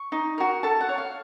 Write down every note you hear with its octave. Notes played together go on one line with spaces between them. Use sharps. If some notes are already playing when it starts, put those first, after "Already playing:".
Already playing: C#6
D#4
F#4 A#4
A4 A5
F#5
C#5
F5